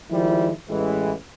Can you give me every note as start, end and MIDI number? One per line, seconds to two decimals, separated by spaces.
0.11 0.51 51
0.11 0.51 53
0.11 0.51 55
0.11 0.51 56
0.11 0.51 64
0.69 1.12 33
0.69 1.12 52
0.69 1.12 56